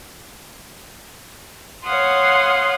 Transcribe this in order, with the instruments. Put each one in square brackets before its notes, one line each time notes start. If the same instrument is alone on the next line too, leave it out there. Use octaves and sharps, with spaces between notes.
[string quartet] C#5 F5 F#5 C6 D#6